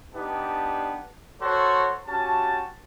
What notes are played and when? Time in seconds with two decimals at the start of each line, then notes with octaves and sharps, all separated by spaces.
0.15 B3 D4 D#4 G4 A5
1.42 F#4 A4 C5 C#5 C6
2.07 C#4 F#4 G4 A5